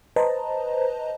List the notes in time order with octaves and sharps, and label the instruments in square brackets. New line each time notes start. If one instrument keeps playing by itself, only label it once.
[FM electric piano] B4 C5 D#5 A5 A#5